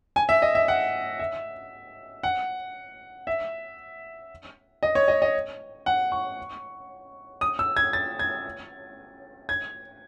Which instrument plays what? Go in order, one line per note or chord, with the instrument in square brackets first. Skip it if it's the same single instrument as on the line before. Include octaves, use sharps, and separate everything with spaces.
[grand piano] G#5
E5
D#5
E5
F#5
E5
F#5
E5
D#5
C#5
D#5
D#5
F#5
C#6
D#6
E6
G#6
A6
G#6
G#6